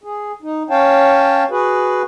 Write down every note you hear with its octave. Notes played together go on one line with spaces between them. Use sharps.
G#4
D#4
C#4 C#5 F5 G5 A5
F#4 G#4 B4